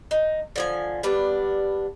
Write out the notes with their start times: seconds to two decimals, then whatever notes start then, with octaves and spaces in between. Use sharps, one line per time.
0.11 D#4
0.56 D3 F3 G#5
1.03 G3 B3 D4